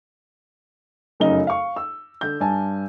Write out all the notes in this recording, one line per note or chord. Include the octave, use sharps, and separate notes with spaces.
F1 F#2 C#3 D#4 D#5 G7
F5 C#6
E6
D3 G6
G2 G#5 A5